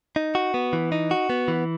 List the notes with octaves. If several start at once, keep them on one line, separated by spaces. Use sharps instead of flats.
D#4
F#4
B3
E3
D#4
F#4
B3
E3